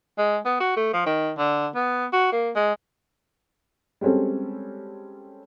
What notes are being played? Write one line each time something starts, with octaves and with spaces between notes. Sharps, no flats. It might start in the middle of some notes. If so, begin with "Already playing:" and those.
G#3
B3
F#4
A3
F3
D#3
D3
B3
F#4
A#3
G#3
G3 G#3 C4 C#4 A4